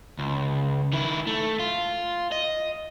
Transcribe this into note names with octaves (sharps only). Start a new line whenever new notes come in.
C#2
D#3 E4
A3
F4
D#5